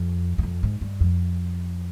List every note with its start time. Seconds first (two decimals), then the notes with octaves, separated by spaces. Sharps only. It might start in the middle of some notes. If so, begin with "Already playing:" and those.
Already playing: F2
0.38 F#2
0.43 F2
0.63 G#2
0.81 G2
1.00 F2